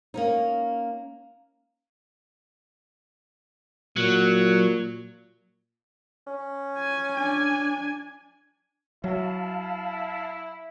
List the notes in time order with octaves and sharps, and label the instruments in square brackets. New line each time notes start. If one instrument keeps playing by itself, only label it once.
[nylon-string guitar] A#3 C#4 D#4
[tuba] A#2 [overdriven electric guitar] F#3
[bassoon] C#4
[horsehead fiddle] G#5
D4 G#5
[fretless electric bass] F#3 [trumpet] E4 [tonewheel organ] F5 A5